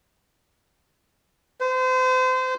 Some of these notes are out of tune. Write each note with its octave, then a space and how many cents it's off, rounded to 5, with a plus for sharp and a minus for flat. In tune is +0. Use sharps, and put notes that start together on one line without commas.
C5 -35